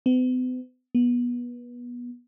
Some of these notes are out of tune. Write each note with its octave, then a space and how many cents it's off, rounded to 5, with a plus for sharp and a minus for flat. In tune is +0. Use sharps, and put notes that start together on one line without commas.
B3 +45
B3 -25